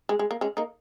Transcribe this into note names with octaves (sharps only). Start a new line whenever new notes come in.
G#3
G#3
A#3
G#3 C#4
A#3 D#4